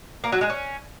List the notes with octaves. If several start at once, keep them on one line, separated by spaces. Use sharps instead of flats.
A#3
F#3
G#3
C#4